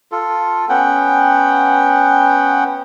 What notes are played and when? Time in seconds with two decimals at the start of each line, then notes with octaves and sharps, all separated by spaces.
0.12 F4 A4
0.69 B3 C#4 F#5 G5